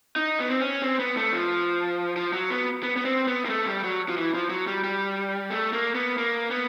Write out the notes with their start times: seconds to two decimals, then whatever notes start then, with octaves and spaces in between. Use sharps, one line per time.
0.16 D#4
0.40 B3
0.50 C4
0.61 C#4
0.83 C4
0.99 B3
1.17 A3
1.32 F3
2.16 F3
2.33 F#3
2.50 B3
2.83 B3
2.96 B3
3.05 C4
3.28 B3
3.45 A#3
3.50 A3
3.66 G3
3.84 F#3
4.08 F3
4.17 E3
4.34 F3
4.50 F#3
4.67 G3
4.84 G3
5.50 A3
5.73 A#3
5.95 B3
6.18 A#3
6.51 B3